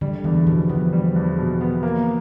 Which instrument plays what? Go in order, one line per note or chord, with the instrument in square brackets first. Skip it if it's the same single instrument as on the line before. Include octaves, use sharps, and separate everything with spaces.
[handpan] D3 [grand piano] G3
[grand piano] E2 [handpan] E3
[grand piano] B2 [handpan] F3
[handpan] F3 [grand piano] B3
[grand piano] G3
E2
B2
B3
A#3